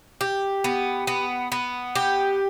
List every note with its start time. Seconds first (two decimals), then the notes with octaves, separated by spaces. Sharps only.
0.21 G4
0.64 B3
1.07 B3
1.52 B3
1.96 G4